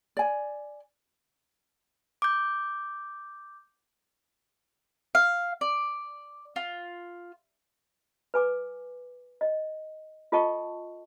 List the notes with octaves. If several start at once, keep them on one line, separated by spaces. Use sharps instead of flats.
D5 G#5
D6 G6
F5
D5
F4
B4 G#5 D6
D#5
F4 A4 D#5 G5 A5 C#6